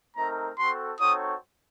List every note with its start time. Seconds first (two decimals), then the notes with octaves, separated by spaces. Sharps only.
0.16 A3 C4 D#4 A#4 A#5
0.58 C4 F#4 A4 C6
1.00 C4 D#4 F#4 A4 C#5 D#6